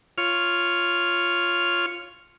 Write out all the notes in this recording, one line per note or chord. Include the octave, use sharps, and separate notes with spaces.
F4 C#5 F6